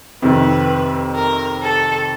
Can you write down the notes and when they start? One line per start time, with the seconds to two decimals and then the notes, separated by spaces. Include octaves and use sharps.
0.22 F2 C3 D#3 B4
1.15 A#4
1.62 A4